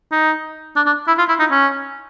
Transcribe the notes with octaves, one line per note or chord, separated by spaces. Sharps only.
D#4
D4
D4
E4
F4
E4
D#4
C#4